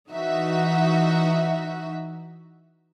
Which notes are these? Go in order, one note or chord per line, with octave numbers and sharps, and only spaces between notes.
E3 D#4 F#4 E5